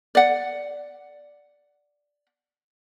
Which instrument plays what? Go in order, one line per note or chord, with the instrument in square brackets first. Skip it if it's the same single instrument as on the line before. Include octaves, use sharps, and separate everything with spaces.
[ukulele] D5 F#5